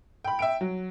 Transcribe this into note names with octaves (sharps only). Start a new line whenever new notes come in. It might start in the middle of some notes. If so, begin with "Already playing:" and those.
G5 B5
E5 G5 D7
F#3